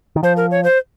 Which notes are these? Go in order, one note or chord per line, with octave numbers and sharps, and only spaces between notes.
D#3
F3 C5
A#4
C#5
C5